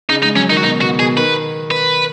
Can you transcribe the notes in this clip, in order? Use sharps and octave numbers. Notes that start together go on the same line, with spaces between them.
C#3 D#4
G#3 D#4
F#3 C#4
D#3 D#4
F#4
B2 D#4
B2 F#4
B2 G#4
D#3 B4
B4